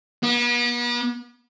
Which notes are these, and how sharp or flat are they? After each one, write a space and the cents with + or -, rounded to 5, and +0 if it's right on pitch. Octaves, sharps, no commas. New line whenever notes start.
B3 -40